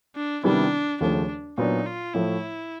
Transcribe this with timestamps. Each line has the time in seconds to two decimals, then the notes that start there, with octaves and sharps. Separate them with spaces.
0.16 D4
0.43 C3 D#3 G3 B3 D4 E4
1.01 D#2 C#3 F3 A3 D4
1.58 A#2 F#3 B3 D4 D#4
1.86 F4
2.14 A2 F3 A3 E4